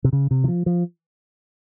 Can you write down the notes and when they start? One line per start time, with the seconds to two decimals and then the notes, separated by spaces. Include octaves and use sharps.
0.04 C3
0.13 C#3
0.31 C3
0.44 E3
0.48 F3
0.66 F3